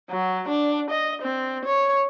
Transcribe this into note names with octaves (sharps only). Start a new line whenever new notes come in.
F#3
D4
D#5
C4
C#5